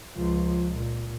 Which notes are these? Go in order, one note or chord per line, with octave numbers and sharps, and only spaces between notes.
C#2 F3
A#2